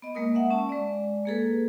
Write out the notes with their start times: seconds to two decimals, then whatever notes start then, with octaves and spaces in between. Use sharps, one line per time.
0.02 B3 D#5
0.15 G#3 A#3 A#4 D#6
0.35 E5 F#5
0.50 C#4 A5
0.69 G#3 D5
1.26 A#3 G#4 A4 B4